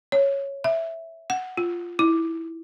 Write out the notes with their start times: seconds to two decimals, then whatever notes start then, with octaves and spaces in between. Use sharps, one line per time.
0.12 C#5
0.64 E5
1.30 F#5
1.57 F4
1.99 E4